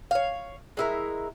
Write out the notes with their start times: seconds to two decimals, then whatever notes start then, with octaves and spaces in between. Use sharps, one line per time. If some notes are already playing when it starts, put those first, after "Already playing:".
0.11 C#5 F5
0.77 G#3 E4 A#4